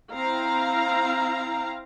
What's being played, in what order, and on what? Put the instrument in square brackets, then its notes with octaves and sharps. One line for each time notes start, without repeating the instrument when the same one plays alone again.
[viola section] C4 E4 F5 A#5